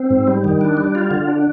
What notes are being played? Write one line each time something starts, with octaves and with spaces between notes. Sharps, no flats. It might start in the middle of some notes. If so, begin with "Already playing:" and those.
Already playing: C4
G#2
G3
D#3
D4
G3
F4
D3
D4